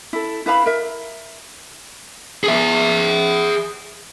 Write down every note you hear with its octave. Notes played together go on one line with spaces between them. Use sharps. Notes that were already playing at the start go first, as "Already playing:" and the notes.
E4 A4
E4 B4 F5 B5
A#4 E5
G#4 E5